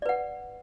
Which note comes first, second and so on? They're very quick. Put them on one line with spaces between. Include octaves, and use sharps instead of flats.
D5 B4 F#5